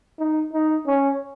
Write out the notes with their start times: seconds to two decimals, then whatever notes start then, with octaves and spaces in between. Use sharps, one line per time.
0.19 D#4
0.53 D#4
0.87 C#4